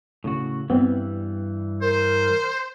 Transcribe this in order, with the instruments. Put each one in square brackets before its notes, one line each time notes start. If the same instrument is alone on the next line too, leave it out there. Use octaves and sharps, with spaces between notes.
[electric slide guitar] A2 C#3 F#4
[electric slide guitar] G2 E3 G3 [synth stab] B3 C4
[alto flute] A#4 [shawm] C5